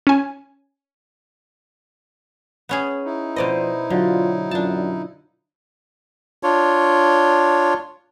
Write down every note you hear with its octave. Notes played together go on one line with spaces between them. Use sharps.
C#4 G#5
B3 C#4 G#4
D#4 E4
B2 F3 B4 C5 D5 D#5
D3 F#3 F4
F#2 D4 F4 A5
D4 F4 C#5